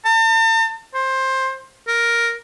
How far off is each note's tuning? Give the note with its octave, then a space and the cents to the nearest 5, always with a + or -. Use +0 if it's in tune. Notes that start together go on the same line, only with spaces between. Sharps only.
A5 +45
C5 +15
A#4 +5